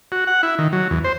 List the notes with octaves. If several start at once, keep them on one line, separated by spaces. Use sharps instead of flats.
F#4
F#5
E4
D#3
F#3
E2
C5